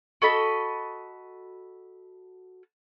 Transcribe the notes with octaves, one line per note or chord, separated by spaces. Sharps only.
F#4 A4 D#5 B5